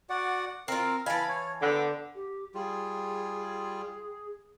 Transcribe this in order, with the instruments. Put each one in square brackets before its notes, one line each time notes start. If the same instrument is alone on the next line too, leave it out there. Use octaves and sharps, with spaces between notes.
[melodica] F#4 D5 F#5
[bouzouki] C4 F4 [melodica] A#4 [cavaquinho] F5
[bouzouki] E3 F5 [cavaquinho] G#5 A5 [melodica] B5
[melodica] C#5
[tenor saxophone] D3 [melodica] B3 G5 D6
[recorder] G4
[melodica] G3 F4 [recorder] G#4